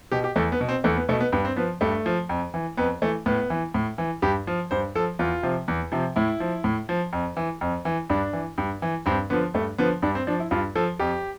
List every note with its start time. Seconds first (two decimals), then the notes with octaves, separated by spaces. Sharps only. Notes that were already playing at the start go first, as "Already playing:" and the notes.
0.12 B2 G4
0.24 G4
0.36 E2 A3
0.52 B3
0.61 B2
0.69 C4
0.84 E2 A3
0.97 B3
1.09 B2 A3
1.20 B3
1.32 G2 B3
1.45 C4
1.56 F3 B3
1.81 G2 A3
2.06 F3
2.29 F2
2.54 E3
2.77 F2 B3
3.02 E3 A3
3.26 A2 B3
3.50 E3
3.74 A2
3.98 E3
4.22 G2 G4
4.47 F3
4.71 G2 C5
4.95 F3 A4
5.19 E2 F4
5.43 C3 F3
5.68 E2
5.92 C3 F3
6.16 A2 E4
6.40 F3
6.64 A2
6.89 F3
7.13 F2
7.37 E3
7.61 F2
7.85 E3
8.10 G2 D4
8.33 E3
8.58 G2
8.82 E3
9.06 G2 C4
9.30 D3 F3 B3
9.54 G2 A3
9.78 D3 F3 B3
10.02 G2 D4
10.15 C4
10.27 F3 D4
10.40 E4
10.51 G2 F4
10.75 F3 A4
10.99 F2 G4